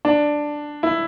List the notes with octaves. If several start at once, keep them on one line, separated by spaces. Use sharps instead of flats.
D4
E4